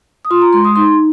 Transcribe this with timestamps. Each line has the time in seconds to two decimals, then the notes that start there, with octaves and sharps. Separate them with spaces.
0.25 D#6
0.31 F4 C6
0.42 A#5
0.53 G#3 C6
0.65 D#6
0.76 D#4 C6